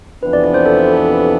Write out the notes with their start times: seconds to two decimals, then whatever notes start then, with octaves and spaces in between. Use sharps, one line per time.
0.23 F2 C3 E3 B3 D4 B4
0.33 D5
0.44 D5
0.54 C5
0.66 A4
0.79 A4
0.93 A4